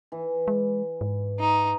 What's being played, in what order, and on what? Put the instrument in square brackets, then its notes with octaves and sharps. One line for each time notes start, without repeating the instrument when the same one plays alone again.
[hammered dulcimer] E3
[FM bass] G#3
G#2
[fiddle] D#4